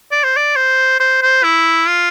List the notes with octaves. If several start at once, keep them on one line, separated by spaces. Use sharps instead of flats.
D5
C5
D5
C5
C5
C5
E4
F4